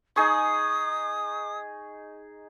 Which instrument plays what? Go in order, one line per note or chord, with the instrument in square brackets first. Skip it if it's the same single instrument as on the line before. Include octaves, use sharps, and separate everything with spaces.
[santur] D#4 G#4 C#6 [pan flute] D#6